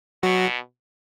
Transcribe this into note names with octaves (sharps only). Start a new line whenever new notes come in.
B2 F#3 F#4